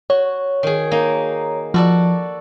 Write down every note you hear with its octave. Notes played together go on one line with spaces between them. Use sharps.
F#4 C#5
D#3 G#4
A#3 D#4
F3 F#4 A4 D5